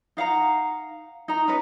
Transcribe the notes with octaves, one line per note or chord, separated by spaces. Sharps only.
D#4 F5 F#5 A#5
D#4 A#5
C#4 B4 D#5